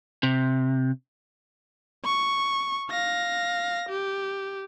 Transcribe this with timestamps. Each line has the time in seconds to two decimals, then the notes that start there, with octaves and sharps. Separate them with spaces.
0.23 C3
2.05 C#6
2.90 F5 A#6
3.89 G4